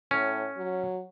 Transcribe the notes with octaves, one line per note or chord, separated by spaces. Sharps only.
A2 C#4
F#3